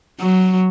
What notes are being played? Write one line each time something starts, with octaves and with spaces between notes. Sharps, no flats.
F#3